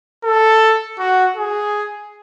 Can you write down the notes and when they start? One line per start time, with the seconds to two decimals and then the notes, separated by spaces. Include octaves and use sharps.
0.24 A4
0.99 F#4
1.37 G#4